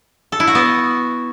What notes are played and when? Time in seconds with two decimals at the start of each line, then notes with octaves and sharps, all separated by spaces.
0.32 A4
0.40 E4
0.47 F#4
0.55 B3